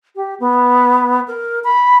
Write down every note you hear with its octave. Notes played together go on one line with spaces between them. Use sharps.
G4
B3
A#4
B5